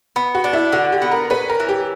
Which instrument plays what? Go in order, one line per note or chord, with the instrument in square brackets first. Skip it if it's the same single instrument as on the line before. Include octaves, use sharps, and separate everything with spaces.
[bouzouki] B3
[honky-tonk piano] F#4
[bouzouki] D4
[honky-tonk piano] E4
[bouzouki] D3 [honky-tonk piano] F#4
[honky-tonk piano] G4
[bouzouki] B3
[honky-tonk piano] A#4
[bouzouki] C#4 [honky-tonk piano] B4
[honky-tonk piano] A#4
[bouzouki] E3
[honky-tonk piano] G4